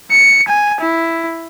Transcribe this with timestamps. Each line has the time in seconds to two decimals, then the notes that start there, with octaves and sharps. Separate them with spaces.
0.11 C#7
0.48 G#5
0.81 E4